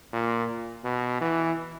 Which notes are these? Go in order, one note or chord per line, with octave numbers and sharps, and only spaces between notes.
A#2
B2
E3